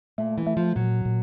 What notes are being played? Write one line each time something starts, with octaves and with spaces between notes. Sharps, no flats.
A#2 A3
E3
A3
F3
A#2 F#3
A#2